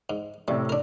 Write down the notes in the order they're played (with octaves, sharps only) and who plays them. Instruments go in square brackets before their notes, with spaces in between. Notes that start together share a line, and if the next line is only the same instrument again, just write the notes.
[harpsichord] G#2
[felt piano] A2 C3 [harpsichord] G3
[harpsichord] D4 A#4